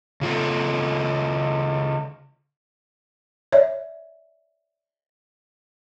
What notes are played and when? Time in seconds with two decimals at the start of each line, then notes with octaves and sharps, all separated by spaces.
0.21 C#3 F4 A4
3.52 C#5 D5 E5